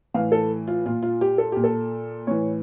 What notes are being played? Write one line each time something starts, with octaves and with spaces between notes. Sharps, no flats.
A2 E3 F5
A4
F4
A#2 F4
F4
G4
A4
A#2 G4
A4
A2 E3 C#5